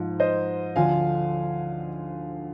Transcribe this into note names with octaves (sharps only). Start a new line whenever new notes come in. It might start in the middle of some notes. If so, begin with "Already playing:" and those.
Already playing: G#2 F3
C5 D#5
D2 D3 F3 F5 G#5